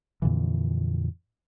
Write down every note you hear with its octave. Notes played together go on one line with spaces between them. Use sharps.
F2 A#2 D3 E3